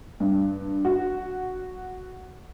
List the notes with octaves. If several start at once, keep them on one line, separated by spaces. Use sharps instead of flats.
G2
F#4